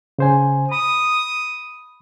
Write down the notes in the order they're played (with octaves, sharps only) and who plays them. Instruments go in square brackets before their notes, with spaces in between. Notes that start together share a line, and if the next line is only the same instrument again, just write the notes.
[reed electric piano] C#3 C5 G#5
[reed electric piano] B5 [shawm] D#6